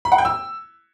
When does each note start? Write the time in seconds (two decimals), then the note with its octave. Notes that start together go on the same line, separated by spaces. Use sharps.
0.05 B5
0.12 F#5
0.18 G5
0.25 E6